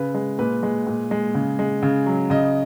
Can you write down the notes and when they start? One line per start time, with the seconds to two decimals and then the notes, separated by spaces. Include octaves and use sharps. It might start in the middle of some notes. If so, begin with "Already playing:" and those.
Already playing: C#3 B4
0.14 G#3
0.39 A#2 B4
0.63 G#3
0.87 A#2
1.11 G#3
1.34 C#3
1.59 G#3
1.82 C#3
2.06 F#3
2.30 C#3 D#5